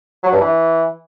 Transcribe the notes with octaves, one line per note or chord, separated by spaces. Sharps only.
F#3
G2
E3